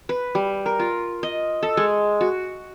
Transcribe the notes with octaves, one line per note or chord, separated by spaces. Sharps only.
B4
G3
A#4
F4
D#5
A4
G#3
F#4